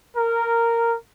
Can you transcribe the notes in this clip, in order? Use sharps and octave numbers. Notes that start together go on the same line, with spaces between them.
A#4